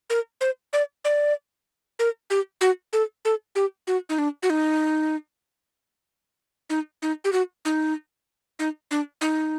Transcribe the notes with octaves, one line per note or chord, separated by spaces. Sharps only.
A#4
C5
D5
D5
A#4
G4
F#4
A4
A4
G4
F#4
D#4
D4
F#4
D#4
D#4
D#4
G4
F#4
D#4
D#4
D4
D#4